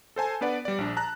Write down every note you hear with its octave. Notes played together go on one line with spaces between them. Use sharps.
A4 C5 G#5 A5
B3 D4 B4 D5 F#5
G3 D5
A#1 D4
A5 A#5 F#6